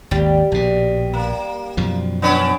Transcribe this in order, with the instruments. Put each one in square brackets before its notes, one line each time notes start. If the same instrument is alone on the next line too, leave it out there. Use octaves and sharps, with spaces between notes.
[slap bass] G#1 D#2 [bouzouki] G3
[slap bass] A#1 B2
[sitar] A#3
[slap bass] F#2 B2 F3
[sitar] B3 C#4 D4